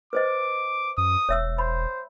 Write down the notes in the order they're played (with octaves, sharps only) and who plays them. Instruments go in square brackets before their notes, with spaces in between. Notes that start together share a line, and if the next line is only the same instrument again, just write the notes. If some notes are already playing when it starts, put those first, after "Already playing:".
[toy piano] B4 C5 D#5 [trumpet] D6
[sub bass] F#2 [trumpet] D#6
[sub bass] E1 [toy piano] C#5 E5 E6
[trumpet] C5 [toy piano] B5